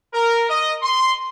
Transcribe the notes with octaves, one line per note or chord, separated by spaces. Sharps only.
A#4
D#5
C6